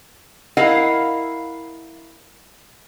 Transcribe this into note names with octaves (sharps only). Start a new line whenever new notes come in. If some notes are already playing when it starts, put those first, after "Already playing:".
E4 A#4 D#5 F5 F#5